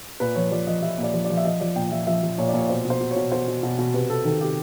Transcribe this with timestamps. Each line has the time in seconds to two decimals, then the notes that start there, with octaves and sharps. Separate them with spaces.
0.20 A#2 B4
0.36 F3 C#5
0.51 F3 D5
0.67 F3 D#5
0.78 D#5
0.82 F3 E5
0.98 A#2
1.03 D5
1.14 F3
1.24 D5
1.30 F3
1.37 E5
1.45 F3 D#5
1.60 F3 D5
1.76 A#2 G5
1.92 F3 E5
2.07 F3 E5
2.23 F3
2.38 A#2 C#5
2.48 D5
2.54 A#2
2.59 C#5
2.69 B2 C5
2.85 B2
2.90 C5
3.01 B2
3.11 C#5
3.16 B2
3.32 B2 C5
3.48 B2
3.63 B2
3.78 B2
3.94 C3 B4
4.10 C3 A4
4.25 D#3 A4
4.41 C3 G4